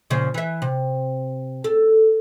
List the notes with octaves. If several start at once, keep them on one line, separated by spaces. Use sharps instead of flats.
A#2 C#3 F3
E3 E5
C3
A4